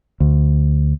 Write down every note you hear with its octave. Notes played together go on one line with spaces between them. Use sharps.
D2